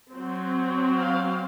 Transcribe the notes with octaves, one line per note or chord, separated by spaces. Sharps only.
F#3 C4
F5